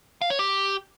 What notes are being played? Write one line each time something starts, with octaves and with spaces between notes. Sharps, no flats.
F5
C#5
G4